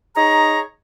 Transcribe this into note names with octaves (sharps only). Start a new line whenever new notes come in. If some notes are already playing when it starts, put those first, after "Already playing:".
D#4 G#4 C#5 A#5